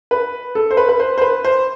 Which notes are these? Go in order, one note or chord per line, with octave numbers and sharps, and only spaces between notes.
B4
A4
C5
B4
B4
C5
C5
B4
C5